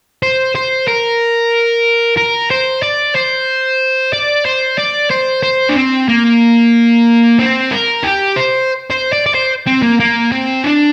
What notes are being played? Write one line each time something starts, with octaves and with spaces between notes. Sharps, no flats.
C5
C5
A#4
A#4
C5
D5
C5
D5
C5
D5
C5
C5
D4
C4
A#3
C4
A#4
G4
C5
C5
D5
D5
C5
C4
A#3
A#3
C4
D4